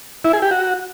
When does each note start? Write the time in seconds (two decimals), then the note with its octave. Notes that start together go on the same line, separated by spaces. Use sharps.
0.24 E4
0.33 G#4
0.42 G4
0.51 F#4